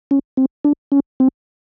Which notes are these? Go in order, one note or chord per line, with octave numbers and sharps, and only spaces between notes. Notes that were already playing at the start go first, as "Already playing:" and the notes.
C#4
C4
D4
C#4
C4